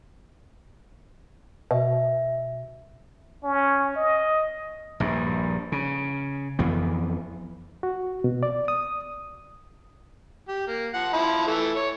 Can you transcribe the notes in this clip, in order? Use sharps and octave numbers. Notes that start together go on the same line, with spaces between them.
B2 E5
C#4
D#5
A#1 G2
C#3
F2 E3 B3
F#4
B2
D5
D#6
G4
A#3
F3 F#5
F3 E4 B5
E3 A3
C#5